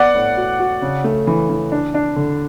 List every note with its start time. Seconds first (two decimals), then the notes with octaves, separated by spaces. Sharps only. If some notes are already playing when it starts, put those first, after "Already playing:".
Already playing: B3 D5 F#5
0.14 A2
0.37 F#4
0.60 F#4
0.82 C#3
1.04 A3
1.27 E3
1.49 E3
1.72 D4
1.94 D4
2.16 D3